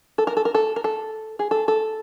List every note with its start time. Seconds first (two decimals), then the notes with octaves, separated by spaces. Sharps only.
0.18 A4
0.27 A#4
0.37 A4
0.45 A#4
0.55 A4
0.76 A#4
0.84 A4
1.39 G#4
1.51 A4
1.68 A4